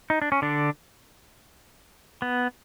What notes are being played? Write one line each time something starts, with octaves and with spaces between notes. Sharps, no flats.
D#4
D4
C#4
D3 D4
B3